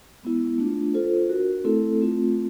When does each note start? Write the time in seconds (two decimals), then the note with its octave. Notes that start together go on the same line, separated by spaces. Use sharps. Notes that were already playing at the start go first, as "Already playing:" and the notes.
0.23 G#3 B3 E4
0.58 A3 D4 F4
0.94 F4 A4 C5
1.29 D4 F#4 A#4
1.64 A3 C4 E4 A4
2.01 A3 C4 F4